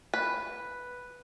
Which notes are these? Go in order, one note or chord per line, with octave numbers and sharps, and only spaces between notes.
B4